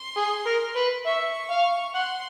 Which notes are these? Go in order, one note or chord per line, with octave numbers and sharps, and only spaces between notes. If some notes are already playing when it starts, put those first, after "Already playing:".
Already playing: C6
G#4
A#4
B4
E5 C#6
F5
F#5 C6